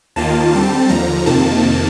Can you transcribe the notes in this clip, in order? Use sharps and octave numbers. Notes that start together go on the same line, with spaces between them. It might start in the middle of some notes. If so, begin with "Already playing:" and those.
D#2 D#3 A#3 F4 A5
D3 G3 C4 A5
D#2 D3 F3 A#5
F2 C3 D#3 A#3 A5